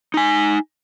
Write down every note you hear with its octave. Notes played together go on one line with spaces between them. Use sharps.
D#4 G#5